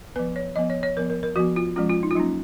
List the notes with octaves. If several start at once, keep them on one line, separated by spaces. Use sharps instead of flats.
F3 B3 B4
C#5
F3 B3 D#5
C#5
C#5
F3 B3 A#4
A#4
A#4
F3 B3 F#4
F4
F3 G#3 C#4 F4
F4
D#4
F4
F#3 A#3 C#4 D#4